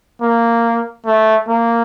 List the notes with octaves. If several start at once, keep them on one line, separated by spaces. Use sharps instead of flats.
A#3
A3
A#3